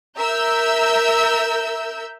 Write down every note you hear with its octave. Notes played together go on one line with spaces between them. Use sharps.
A#4 E5 E6 G6